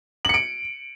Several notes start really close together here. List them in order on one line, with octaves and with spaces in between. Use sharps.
F#7 C#7 D7